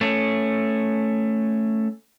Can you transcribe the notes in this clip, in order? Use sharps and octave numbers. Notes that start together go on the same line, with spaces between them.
A3 C#4